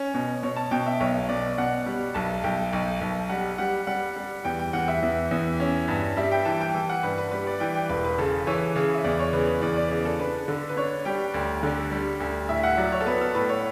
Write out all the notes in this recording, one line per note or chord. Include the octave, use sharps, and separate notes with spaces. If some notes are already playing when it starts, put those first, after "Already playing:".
Already playing: C#4
B2
B2 C#5
A5
B2 G5
E5
B1 C#5
B2 D5
B2 F#5
G3
B1 A5
B1 G5
B1
B1
G3 F#5
G3 F#5
G3 F#5
G3
E2 G5
G5
E2 F#5
E5
E2
E2
C#4
G2
G3 E5
G5
E3 A5
G5
E3
F#5
G2 B4
B4
G3 B4
D5
E3 G5
G5
E1 B4
B4
C#3 A4
E3 C#5
C#3 C#5
E5
E2 D5
C#5
C#3 B4
B4
E2 D5
D5
C#3 D5
A4
D4 B4
D3
B4
D4 C#5
G3 G5
D2
D3
G3
D2
A2 E5
F#5
F#3 D5
C#5
A4
B3 B4
A4
A2 B4
C#5